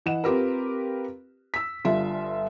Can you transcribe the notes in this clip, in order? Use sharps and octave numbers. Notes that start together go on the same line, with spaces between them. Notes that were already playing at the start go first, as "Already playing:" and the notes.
E3 D#5 F#5 E7
C4 F4 G4 A#4 B4
E6 B6
G1 G2 F4 E5